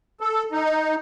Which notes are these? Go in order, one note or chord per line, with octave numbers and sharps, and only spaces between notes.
A4
D#4